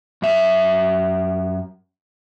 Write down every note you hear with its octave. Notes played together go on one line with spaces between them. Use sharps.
F#2 E5